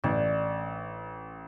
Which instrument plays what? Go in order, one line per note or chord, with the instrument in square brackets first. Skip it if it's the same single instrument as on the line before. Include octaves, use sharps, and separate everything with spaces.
[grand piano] A1 [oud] D4